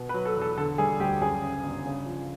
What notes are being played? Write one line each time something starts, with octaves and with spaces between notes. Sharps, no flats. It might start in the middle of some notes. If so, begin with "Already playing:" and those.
Already playing: B2
B4
F#3
A4
E2
A4
D3 A4
G3 G#4
D2 G4
F#2 G#4
C#3
G1
C#3
F3